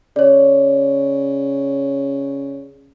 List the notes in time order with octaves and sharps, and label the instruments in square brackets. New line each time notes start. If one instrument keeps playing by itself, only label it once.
[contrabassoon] C#3 [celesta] C#5 D5